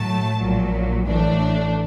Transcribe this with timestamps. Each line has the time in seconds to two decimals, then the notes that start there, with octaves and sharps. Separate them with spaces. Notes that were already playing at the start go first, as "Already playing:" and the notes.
Already playing: A2 F#3 A3 A5
0.39 A#1 A#2 F#3
1.05 A1 A2 E3 A3 D4